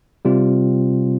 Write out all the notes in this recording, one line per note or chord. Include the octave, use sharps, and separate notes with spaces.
C3 G3 C4 F4